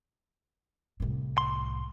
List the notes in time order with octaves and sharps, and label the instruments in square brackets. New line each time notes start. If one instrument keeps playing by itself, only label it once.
[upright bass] C2 A2
[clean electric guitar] C6